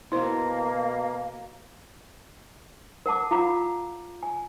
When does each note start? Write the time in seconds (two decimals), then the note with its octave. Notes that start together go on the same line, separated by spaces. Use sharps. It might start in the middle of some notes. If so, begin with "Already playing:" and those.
0.12 B2 A#3 E4 C5
3.06 A#4 F#5 A5 D6
3.31 F4 F5 F#5 A#5 B5 D6
4.23 G#5